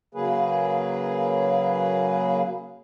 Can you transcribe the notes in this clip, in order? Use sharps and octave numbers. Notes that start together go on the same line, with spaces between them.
C#3 F#3 A#3 G#4 B4